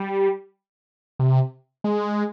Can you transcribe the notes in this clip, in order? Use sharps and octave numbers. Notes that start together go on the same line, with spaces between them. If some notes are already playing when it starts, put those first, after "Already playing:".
Already playing: G3
C3
G#3